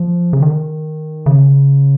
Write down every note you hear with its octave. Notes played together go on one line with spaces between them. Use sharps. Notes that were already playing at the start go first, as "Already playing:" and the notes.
Already playing: F3
C#3
D#3
C#3